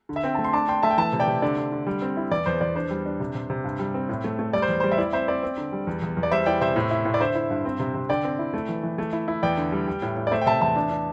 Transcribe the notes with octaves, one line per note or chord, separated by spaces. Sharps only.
D3
E5
C4 G5
A3 A5
C6
D4 A5 D6
D4 G5 C6
A3 E5 A5
G5
E3 E5 A5
C3
D5 G5
C3
D3 D5
D3
D3
G3
C4
E4
E2 D5
E2 C5
E2 D5
D4 C5
G3
D4
C3
C3
C3
G2
G3
C4
A2
A3
A3
G3 D5
C5
E2
G3 C5
E5
E4 D5
C4 C5 E5
C4 D5
C4
D3
G3
E2
E2
E2
D5
G3 C5 E5
E4 D5 G5
C3 C5 E5
A2
E4
A2
D5
D3 C5 E5
E4
G2
C4
C3
C3
D3 D5 G5
C4
E4
A3
E3
E3
A3
E4
E4
E2 D5 G5
D3
G3
G3
A2
A2
D5
A3 C5 E5
G5
C3 E5 A5
E2 E5 A5
D4
D4